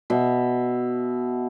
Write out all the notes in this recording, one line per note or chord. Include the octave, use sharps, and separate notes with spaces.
B2 E5